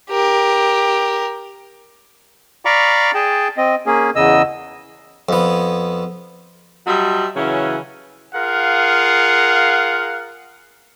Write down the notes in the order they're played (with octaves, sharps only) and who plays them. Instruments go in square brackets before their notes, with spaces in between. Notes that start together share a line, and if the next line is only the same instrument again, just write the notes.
[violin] G4 A#4
[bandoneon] D5 F5 A#5 B5 C#6 D6
G#4 G5 A5
C4 D#5
A#3 C#4 G#4
E2 C#3 D#5 E6
[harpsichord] F2 B3
[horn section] F#3 G3 D#5 E5 A5 C6
C#3 E3 F#3 C#4
[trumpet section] F4 G#4 A#4 F5 F#5